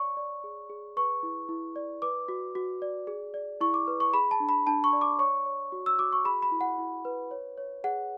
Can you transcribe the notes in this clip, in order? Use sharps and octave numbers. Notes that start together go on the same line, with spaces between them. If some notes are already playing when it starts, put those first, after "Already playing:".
Already playing: C#5 D5 C#6
D5
G#4
G#4
B4 C#6
E4
E4
D5
B4 D6
F#4
F#4
D5
G#4
D5
E4 C#6
D6
B4
C#6
G#4 B5
A5
D4
B5
D4 A5
C#6
D5
D6
C#5 C#6
C#5
F#4
E6
F#4 D6
C#6
G#4 B5
B5
E4
F#5
E4
B4
C#5
C#5
G#4 F#5